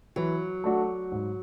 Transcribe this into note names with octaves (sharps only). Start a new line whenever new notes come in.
E3 F#3
A3 D4 F#4
G#2